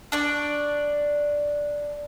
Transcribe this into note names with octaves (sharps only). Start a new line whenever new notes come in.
D4 D5 C#6